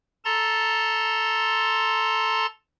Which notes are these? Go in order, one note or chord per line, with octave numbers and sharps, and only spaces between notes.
A4 A5 A#5 C6 A6